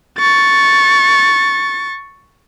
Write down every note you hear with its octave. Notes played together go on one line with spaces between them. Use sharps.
C#6 A6